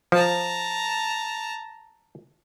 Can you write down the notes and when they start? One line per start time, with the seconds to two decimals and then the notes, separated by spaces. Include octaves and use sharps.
0.12 F3 A5 A#5